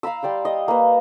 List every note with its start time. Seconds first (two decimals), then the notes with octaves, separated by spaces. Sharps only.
0.03 F5 A#5 B5 E6
0.23 G3 D5 G5 C6
0.45 D#5
0.68 A#3 B4